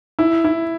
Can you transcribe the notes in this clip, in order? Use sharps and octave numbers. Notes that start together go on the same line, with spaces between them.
E4
E4